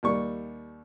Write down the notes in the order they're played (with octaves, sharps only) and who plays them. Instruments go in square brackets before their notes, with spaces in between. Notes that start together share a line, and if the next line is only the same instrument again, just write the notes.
[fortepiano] D#2 G3 C#6